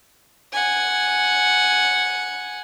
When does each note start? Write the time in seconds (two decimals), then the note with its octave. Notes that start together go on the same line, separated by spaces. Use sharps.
0.53 F#5 G#5